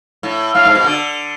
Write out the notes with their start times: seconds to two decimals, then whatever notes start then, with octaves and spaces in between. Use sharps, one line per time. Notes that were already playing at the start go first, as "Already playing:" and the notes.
0.23 A2
0.54 A2 F5
0.65 G#2
0.75 B2
0.84 D3